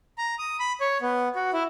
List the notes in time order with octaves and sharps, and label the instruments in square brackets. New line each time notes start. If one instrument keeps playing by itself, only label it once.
[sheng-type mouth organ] A#5
D#6
B5
C#5
B3
F#4
E4